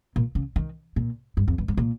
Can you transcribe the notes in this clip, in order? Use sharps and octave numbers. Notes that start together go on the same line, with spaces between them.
A#2
C#3
D#3
A#2
G2
F2
G2
G#2
A#2